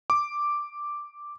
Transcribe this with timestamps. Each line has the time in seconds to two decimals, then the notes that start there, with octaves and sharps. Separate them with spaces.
0.10 D6